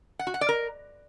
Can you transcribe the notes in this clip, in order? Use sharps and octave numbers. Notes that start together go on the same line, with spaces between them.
F#5
F#4
F#5
D5
A#4